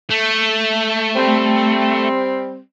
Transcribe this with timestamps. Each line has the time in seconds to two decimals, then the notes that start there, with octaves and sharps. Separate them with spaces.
0.10 A3
1.15 G3 C4